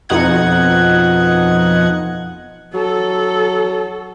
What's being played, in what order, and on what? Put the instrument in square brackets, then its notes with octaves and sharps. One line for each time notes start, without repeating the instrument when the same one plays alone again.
[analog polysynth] F2 B2 D#4 F#5 G#6
[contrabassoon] F#3 [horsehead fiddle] A4